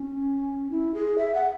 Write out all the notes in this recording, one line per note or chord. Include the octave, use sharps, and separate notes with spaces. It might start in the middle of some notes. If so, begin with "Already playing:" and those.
Already playing: C#4
E4
G#4
E5
F#5